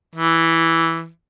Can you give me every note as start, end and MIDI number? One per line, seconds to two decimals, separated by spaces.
0.15 1.08 52